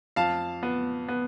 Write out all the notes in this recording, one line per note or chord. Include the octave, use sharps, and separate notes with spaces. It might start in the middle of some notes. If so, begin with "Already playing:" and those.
F2 F5 A5
B3
B3